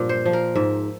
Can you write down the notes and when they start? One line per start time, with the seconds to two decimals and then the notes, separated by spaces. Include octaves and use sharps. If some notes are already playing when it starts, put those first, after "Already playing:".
Already playing: G2 A#2 F3
0.09 C5
0.26 F3
0.33 A#4
0.55 G#2 E5